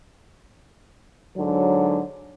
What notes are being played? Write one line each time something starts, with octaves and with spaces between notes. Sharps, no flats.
G#2 D3 F#3